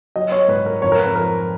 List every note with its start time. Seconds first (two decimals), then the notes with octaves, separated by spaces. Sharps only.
0.16 F#3 D#5
0.32 C#5
0.48 G#2 B4
0.66 A#4
0.82 F2 C#5
0.92 A#4
0.99 B4
1.16 F3 A#4